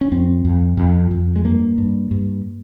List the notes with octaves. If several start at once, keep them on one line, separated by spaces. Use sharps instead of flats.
C#4
F2 C4
F2
F2
F2
G#3
G2 A#3
G2
G2